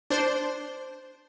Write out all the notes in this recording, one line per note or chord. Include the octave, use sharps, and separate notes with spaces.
D4 C5